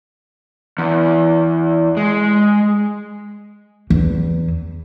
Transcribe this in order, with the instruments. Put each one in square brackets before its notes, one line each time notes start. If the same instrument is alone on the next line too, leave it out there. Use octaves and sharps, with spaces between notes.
[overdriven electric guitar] E2
G#3
[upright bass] E2